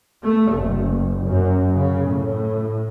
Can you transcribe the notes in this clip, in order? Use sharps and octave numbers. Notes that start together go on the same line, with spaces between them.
A3
F#1
F#2
C#3
A2